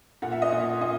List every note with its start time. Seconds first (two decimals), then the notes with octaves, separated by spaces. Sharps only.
0.22 A#2 F#5
0.32 E5
0.42 D#5
0.51 A#2 E5
0.81 A#2 D#5